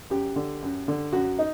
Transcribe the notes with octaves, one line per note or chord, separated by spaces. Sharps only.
F#2 G4
D3
F#2
D3
F#2 F#4
D#4